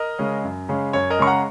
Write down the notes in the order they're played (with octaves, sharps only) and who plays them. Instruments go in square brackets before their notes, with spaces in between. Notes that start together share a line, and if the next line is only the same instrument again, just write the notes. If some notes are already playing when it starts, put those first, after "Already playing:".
Already playing: [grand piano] A#4 D#5
C#3 G#3 C#4
F#2
C#3 G#3 C#4
F#2 C#5
A#4 D#5
C#3 G#3 C#4 C#6
F#5 A#5